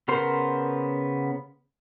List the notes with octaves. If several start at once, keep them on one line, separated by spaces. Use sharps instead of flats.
C#3 B3 A#4 C5 C6